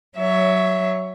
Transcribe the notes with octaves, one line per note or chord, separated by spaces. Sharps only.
F#3 C#5 E5